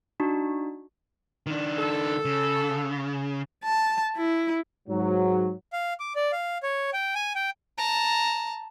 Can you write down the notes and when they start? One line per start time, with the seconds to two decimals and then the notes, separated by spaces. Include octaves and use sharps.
0.20 D4 D#4 F#4
1.46 D#3 D4
1.76 A4
2.25 C#3
3.64 A5
4.17 E4
4.89 G#2 F#3
5.73 F5
6.00 D6
6.15 D5
6.32 F5
6.63 C#5
6.93 G5
7.15 G#5
7.35 G5
7.78 A5 A#5